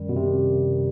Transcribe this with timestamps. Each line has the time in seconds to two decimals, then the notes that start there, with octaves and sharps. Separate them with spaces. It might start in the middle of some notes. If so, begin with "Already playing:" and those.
Already playing: F#2 D#3 G3
0.09 B2
0.16 C3